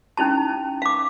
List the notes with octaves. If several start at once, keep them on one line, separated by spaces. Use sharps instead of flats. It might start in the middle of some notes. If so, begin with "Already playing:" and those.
C#4 D#4 E4 A5
F5 D6